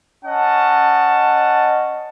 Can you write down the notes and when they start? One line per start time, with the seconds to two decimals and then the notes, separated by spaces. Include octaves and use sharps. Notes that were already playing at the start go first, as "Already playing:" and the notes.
0.24 C#4 D#5 F#5 A5